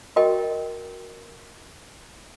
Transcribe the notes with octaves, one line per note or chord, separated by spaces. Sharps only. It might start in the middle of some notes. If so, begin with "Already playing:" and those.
F#4 A#4 D#5 G5